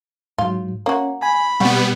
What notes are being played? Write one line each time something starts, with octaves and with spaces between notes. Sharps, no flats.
G#2 F#3 F4
A#3 C#4 F#4 C#5
G#5 B5
B2 G3 B3 C4 F#4